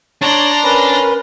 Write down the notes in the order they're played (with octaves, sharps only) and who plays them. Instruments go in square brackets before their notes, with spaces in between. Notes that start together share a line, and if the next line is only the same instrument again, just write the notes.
[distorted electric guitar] D4 [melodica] C#5 A5 [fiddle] A#5 C6
[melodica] C#4 B4 [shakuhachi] A#4